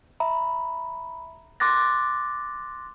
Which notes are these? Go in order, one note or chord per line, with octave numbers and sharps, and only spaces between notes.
E5 A#5 B5
C6 D6 F#6 A6 A#6